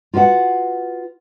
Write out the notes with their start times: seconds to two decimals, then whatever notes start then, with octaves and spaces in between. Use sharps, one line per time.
0.14 F4 F#4 B4 D5 F#5